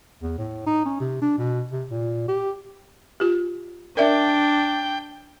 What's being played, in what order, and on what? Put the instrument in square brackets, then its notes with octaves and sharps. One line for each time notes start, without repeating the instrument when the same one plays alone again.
[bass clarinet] E2
A2
D#4
C#4
C3
D4
B2
C3
A#2
G4
[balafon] F4 G4
[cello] D4 [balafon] A#4 D5 E5 [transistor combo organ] G5